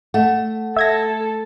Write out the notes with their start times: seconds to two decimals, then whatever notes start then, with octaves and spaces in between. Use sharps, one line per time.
0.14 A3 F#5
0.76 A4 E5 G#6 A#6